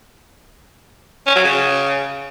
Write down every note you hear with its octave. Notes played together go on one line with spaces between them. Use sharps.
C#4
F#3
C#3